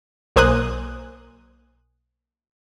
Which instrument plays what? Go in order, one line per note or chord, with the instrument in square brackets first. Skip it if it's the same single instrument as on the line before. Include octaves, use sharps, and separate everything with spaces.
[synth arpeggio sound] B1 A#3 C5 G#5 D#6 F#6